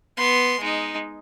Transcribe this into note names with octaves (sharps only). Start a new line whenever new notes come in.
B3 C6
G#3 D#4